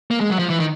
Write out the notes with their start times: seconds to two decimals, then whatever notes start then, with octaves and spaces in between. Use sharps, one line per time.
0.11 A#3
0.20 G#3
0.30 F#3
0.39 F3
0.50 E3
0.60 D#3